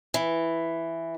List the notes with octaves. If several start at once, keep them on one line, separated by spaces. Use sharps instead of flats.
E3